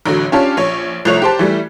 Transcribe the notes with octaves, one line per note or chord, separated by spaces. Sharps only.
A1 F#2 D3 F#3
C#4 D4 F4 G4 C#5 A5
A#1 C#5
C2 F3 A3 C#5 F#6 F7
G4 C5 A5
E3 G3 A3